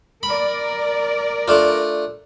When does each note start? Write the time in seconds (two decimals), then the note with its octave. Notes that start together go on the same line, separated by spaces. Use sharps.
0.23 A#4 D5 B5
1.48 A3 D4 F4